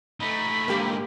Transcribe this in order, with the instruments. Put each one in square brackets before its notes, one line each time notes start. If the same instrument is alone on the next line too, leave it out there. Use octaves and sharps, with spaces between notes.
[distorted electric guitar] A3 D#4 [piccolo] B5
[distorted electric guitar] G#2 D3 [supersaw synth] A#3 G4